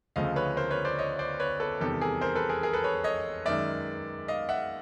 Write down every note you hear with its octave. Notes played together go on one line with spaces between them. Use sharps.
D2 C#3 F3 A3 D#5 F5
B4 C#5
A#4 C5
B4 C#5
C5 D5
C#5 D#5
C5 D5
B4 C#5
A4 B4
E2 C3 D#3 G3 G4 A4
G#4 A#4
A#4 C5
A4 B4
G#4 A#4
G#4 A#4
A4 B4
B4 C#5
C#5 D#5
F#2 D#3 G#3 D5 E5
D#5 F5
E5 F#5